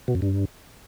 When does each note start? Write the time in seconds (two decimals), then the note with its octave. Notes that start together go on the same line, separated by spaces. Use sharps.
0.08 B2
0.15 F#2
0.22 G2